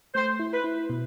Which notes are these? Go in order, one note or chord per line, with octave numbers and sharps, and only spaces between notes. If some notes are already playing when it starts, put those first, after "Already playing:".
A3 C5
E4
B4
E4
B2